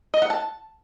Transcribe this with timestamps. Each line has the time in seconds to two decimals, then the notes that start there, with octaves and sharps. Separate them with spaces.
0.14 D#5
0.22 F#5
0.30 A5